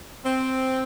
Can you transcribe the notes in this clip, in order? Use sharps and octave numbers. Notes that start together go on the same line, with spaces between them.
C4